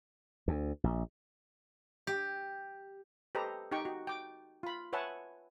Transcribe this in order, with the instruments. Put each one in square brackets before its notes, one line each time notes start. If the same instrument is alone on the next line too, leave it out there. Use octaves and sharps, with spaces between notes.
[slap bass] D2
A#1
[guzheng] G4
[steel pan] G4 A4 B4 C5 D#5 A#5
D#4 G4 G5 C#6
F#4
G5 D6
F4 B5
B4 C#5 E5 F#5 G#5 A5